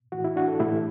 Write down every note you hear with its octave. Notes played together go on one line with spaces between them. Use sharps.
A2 E3 F#4
E4
D4 F#4
A4
A2 E3 E4 G4